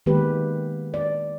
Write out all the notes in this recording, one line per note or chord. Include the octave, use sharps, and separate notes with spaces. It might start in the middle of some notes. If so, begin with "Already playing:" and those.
D#3 G#3 A#3 B3 G4 B4
D5